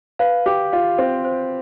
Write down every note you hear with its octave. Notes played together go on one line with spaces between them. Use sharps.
B4 F5
G4 D6
F4 F5
C4 C5
C5